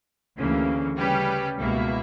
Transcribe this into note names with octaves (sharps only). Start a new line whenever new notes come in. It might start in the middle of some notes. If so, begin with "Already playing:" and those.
D2 C#3 E3 A#3
C#3 G3 C#4 G4 B4
C#2 B2 A#3 E4